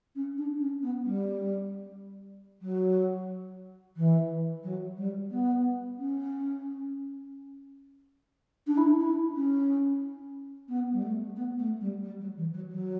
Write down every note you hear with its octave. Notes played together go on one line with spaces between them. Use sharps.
C#4
D4
C#4
B3
G3
F#3
E3
F#3
G3
B3
C#4
D4
E4
D4
E4
C#4
B3
G3
A3
B3
A3
G3
G3
F#3
E3
F#3
F#3